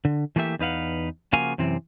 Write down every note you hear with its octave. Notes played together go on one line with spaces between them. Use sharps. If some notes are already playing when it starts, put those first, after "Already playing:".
D3
E3 A3 A#3 G4 E5
E2 D#4 B4 F5 F#5
C#3 F3 A#3 F#4 F5 G#5
F#2 C3 E3 C4